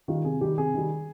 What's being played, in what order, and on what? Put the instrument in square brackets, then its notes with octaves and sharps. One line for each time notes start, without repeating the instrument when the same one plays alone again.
[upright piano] D#3 G3 F4
C3 G#4
D#3 G3 G4
C3 G#4
D#3 G3